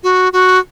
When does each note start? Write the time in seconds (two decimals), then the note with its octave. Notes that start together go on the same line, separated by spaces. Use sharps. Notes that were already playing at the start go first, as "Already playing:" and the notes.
0.03 F#4
0.33 F#4